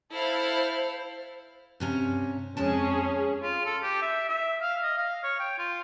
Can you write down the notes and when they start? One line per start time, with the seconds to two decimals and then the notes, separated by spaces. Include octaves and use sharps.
0.14 E4 A4 C5 F5
1.80 G2 C3 C#4
2.57 F2 G#3 C#4 G#4 A5
3.43 F4
3.66 A4
3.83 G4
4.02 E5
4.29 E5
4.62 F5
4.83 D#5
4.98 F5
5.24 C#5
5.40 G5
5.59 F4